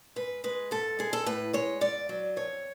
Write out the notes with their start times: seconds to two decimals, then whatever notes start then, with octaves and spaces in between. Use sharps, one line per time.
0.16 G#2 B4
0.44 G#3 B4
0.71 G#2 A4
0.99 G#3 G#4
1.13 A4
1.26 A2 B4
1.53 G#3 C#5
1.81 G#2 D5
2.09 F#3
2.36 F2 C#5